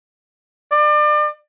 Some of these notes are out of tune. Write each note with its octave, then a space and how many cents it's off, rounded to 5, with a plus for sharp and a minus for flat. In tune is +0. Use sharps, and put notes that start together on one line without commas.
D5 +35